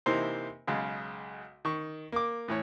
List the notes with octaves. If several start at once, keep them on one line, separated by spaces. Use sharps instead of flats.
C3 E3 A#3 D#4 C5
B1 C#3 G#3
D#3 C#6
A#3 D6
A2 E3 C#5